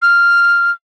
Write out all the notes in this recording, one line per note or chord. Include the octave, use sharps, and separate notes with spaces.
F6